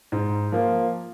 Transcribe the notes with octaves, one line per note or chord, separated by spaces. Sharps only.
G#2
F3 A#3